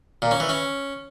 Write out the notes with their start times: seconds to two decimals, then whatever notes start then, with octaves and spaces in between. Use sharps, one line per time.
0.22 A#2
0.31 C#4
0.40 E3
0.49 C#4